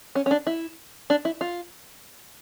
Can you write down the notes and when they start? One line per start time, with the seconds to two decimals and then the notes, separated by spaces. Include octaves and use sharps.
0.15 C#4
0.26 C#4
0.31 D4
0.47 E4
1.10 D4
1.25 E4
1.41 F4